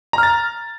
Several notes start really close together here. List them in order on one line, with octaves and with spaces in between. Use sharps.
A#5 F6 A6